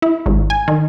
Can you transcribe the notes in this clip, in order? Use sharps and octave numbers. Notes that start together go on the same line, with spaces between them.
E4
G#1
G#5
D#3